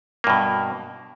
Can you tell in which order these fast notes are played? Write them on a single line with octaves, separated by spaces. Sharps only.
A#3 G2 B2